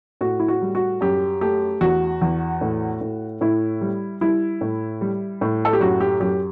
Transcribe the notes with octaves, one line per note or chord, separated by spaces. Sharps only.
A2 F#4
E4
F#4
G3
F#4
F#2 G4
A3 G4
E2 F#4
E2
A2
A2
A2 E4
G3
G3 E4
A2
G3
A2
A4
G4
F#2 F#4
G4
F#2 G4